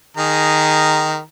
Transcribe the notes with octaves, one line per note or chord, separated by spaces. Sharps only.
D#3 G#4 A#5